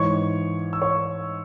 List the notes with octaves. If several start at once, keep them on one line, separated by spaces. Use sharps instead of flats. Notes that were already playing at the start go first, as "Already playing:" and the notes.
Already playing: G#2 E3 C#5 C#6
E6
C#5 C#6